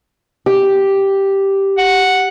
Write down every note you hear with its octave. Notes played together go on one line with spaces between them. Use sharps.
G4
F#5